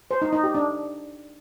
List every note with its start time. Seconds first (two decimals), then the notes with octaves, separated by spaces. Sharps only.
0.11 C5
0.22 D#4
0.33 D#4
0.44 G4
0.55 D4